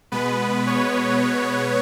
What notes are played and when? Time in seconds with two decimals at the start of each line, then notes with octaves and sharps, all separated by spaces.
0.12 B2 G#3 B3 B4
0.67 C#5